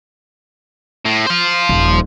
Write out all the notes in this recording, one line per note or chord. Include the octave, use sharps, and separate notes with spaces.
A2
C5 F5
D#1